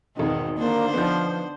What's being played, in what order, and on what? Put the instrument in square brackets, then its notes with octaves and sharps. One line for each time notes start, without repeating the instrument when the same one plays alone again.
[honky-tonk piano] G#1 D#4 [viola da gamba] E2 B2 D#3
[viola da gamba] D3 D4 C5 [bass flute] A#3
[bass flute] F3 [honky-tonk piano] B3 D#4 G6